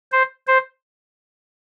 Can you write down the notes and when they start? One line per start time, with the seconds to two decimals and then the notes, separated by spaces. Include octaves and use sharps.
0.12 C5
0.47 C5